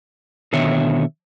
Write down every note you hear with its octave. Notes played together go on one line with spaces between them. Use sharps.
B2 D3 D#3 C#5 E5